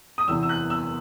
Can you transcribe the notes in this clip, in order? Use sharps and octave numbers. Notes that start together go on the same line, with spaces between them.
D#6
E2 C3 E3 E6
E6
F#6
E6